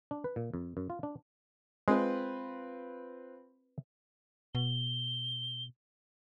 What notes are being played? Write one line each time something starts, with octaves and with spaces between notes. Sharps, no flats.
D4
B4
A#2
F2
F#2
F4
D4
G#3 C4 F4 B4
B2 G7